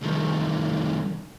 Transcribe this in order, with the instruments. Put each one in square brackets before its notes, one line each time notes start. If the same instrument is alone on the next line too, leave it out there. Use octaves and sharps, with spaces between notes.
[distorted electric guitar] C2 D#3